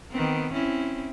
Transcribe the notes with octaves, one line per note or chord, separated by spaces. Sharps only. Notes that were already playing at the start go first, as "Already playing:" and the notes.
D#3 B3 C4
C4 C#4 E4